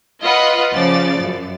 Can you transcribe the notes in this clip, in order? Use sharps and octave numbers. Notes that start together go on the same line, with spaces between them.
F4 B4 D#5 F#5 B5
C#3 F3 D5 A6
F#2